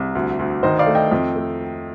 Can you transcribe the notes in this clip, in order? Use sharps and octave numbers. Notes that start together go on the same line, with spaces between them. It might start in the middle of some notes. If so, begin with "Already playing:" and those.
Already playing: C2
D2
D2
D#3 C5 D#5
D5 F5
A3
D#5 G5
F2
A3